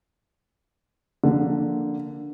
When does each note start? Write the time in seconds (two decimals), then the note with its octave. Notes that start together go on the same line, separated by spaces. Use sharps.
1.24 D3 F3 A#3